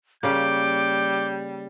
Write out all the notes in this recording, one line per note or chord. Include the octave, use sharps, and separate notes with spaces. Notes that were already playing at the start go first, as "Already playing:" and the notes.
C#3 G3 A#3 D6 G6